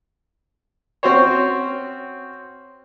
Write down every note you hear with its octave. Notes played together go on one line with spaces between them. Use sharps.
C4 C#4 F#4 C5 C#5